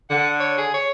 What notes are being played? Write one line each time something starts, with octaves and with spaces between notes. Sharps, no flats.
D3 F#5
C#5
G#4
C#5